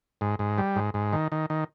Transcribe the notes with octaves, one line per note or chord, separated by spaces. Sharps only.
G#2
G#2
G3
G#2
G#2
D#3
D#3
D#3